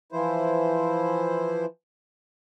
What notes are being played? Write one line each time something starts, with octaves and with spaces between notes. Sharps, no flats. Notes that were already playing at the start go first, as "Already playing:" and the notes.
E3 F3 E4 C5